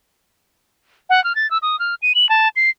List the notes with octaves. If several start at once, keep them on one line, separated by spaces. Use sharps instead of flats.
F#5
F6
A6
E6
D#6
F6
D#7
F#7
A5
C7